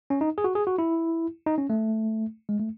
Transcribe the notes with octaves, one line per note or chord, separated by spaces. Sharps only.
C#4
D#4
G#4
F#4
G#4
F#4
E4
D#4
C#4
A3
G#3
A3